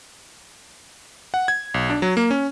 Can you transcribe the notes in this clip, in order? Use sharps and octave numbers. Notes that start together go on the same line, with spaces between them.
F#5
G#6
B1
D4
F#3
A#3
C#4